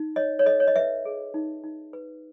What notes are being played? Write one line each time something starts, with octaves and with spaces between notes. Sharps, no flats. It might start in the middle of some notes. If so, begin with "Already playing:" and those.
Already playing: D#4
C#5 D#5
C#5
A4 D#5
C#5
D#5
B4 E5
G#4
D#4
D#4
B4